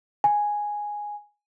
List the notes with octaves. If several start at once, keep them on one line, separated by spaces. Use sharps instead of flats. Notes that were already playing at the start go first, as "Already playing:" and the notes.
G#5